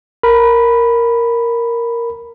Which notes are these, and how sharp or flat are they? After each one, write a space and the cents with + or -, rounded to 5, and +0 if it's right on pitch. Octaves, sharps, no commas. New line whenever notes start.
A#4 +0 B5 +0